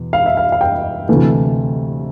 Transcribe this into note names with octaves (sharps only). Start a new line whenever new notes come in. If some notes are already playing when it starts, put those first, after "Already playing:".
Already playing: E2 B2
F5
E5
F5
F5
G5
D2 C3 E3 A3